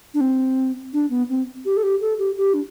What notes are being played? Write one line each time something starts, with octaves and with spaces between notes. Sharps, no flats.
D4
C4
D4
B3
C4
G4
A4
G4
A4
G4
G4
D4